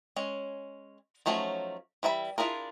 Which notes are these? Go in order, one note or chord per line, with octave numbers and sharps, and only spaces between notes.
G#3 C#4
F3 F#3 A3 C#4 D#4
E3 G3 E5 B5
D4 E4 F4 G#4 A#4